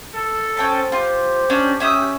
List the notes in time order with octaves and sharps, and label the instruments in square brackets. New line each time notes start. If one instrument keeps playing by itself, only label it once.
[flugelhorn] A4
[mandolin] C#4 G5 A5 [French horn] C5
[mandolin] F4 [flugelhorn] G4
[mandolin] C#4 D4
C#4 E5 D#6